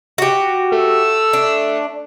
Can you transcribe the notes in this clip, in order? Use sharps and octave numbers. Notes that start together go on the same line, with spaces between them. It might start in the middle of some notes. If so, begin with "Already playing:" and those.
F#4 G4
A3 E6
D4